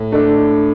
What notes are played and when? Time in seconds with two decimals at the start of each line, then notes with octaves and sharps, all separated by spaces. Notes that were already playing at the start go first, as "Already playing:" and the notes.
Already playing: A2
0.12 A3 D4